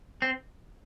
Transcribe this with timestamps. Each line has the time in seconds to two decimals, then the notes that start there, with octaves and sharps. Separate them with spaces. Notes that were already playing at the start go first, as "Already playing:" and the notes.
0.22 C4